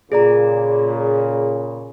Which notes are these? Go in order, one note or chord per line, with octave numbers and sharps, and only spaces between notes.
A#2 C#3 G#4 D5 A#5